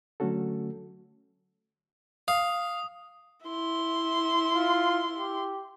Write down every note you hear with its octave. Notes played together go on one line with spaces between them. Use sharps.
D3 F#3 A3 C#4 F#4 A4
F5 D#6
E4 C6
F4
G4